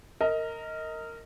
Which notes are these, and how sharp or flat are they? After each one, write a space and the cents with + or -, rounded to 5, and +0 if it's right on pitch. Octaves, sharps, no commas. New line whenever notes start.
A#4 -20 D#5 +20